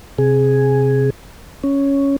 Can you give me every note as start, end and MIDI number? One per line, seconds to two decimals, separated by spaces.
0.18 1.10 48
0.18 1.10 68
1.64 2.16 61